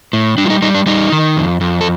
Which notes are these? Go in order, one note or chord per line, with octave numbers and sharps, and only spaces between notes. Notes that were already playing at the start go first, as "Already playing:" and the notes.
A2
G3 D4
F4
D#4
G3 D#4
D4
G3 D#4
D#3
F2
F2
A4